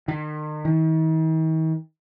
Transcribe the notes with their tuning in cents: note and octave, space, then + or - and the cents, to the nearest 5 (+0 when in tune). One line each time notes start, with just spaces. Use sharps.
D#3 -40
D#3 +45